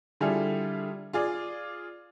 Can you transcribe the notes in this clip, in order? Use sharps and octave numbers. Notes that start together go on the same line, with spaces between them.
D3 G3 E4 F4 G#4 A4
F4 G#4 D5